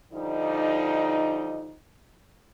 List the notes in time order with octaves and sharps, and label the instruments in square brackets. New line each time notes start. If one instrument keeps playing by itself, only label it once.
[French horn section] D3 F3 G3 D#4